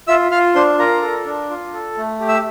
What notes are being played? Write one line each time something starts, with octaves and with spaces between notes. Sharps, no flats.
F4 E5 E6
F4 F5 F6
D4 C5 C6
F4 A#4 A#5
A4
D4
F4
A4
A3
G4
E5 E6